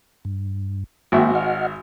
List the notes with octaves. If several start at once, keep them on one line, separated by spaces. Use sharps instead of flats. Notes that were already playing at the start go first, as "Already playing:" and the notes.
G2
G#1 A#3 F#4 E5 G5
D#5 F#5 F6